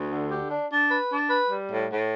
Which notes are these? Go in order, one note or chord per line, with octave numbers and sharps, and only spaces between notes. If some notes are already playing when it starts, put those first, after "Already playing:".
Already playing: D2
D3
G4
D4
D4
B4
D4
B4
G3
A2
A2